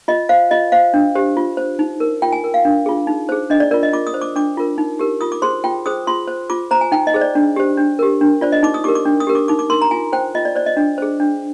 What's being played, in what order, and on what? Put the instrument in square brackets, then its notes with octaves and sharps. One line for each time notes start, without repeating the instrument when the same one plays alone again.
[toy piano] F4 D#5
C5 F5
F4 D#5
C5 F5
D4
G4 C5
F4
C5
D#4
A#4
F4 G5
G#5
A#4
F5
D4
F4 G#4
D#4
G#4 C5
D4 D#5
D5
F4 A#4 D5
D#5
F4 D6
D#6
C5
D6
D4 D6
F4 A#4
D#4
G4 A#4
F4 D#6
D6
G#4 C5 C6
F4 G5
G#4 C5 D#6
F4 C6
C5
F4 D6
C5 A#5
G#5
D#4 G5
D#5
G#4 C5
D5
D4
G4 C5
D4
G4 A#4
D4
F4 C5 D5
D#5
D#4 D6
D#6
G4 A#4 D6
D6
D4
D#6
G4 A#4
D6
D#4 D6
D6
A#4 C6
A#5
F4 G#5
C5 G5
F4 D#5
D5
C5 D5
D#5
D4
G#4 C5
D4